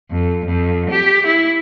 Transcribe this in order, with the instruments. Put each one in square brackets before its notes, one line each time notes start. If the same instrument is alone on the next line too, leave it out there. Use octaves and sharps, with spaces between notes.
[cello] F2
F2
G4
E4